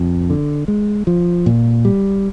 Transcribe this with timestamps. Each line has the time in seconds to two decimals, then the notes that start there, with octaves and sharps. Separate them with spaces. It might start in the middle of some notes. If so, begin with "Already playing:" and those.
Already playing: F2
0.30 D3
0.68 G#3
1.07 F3
1.46 A#2
1.85 G3